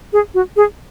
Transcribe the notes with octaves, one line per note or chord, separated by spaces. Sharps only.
G#4
F#4
G#4